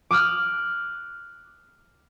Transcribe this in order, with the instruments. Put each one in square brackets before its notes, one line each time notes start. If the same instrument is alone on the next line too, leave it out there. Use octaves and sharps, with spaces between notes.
[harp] D6 D#6 F6 F#6